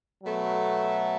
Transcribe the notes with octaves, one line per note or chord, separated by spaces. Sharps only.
B2 F#3 A3